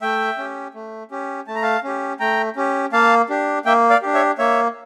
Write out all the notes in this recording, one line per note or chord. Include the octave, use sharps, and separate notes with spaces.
A3 E5 G5
C#4 G4
A3
C#4 G4
A3 A5
A#5
F5 A5
C#4 G4
A3 G5 A#5
C#4 G4
A#3 F5 A5
D4 G4
A#3 E5 G5
D5 F5
D4 G4
C#5 E5
A#3 C#5 E5